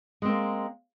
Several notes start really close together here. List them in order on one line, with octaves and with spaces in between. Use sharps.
G#3 C4 A#3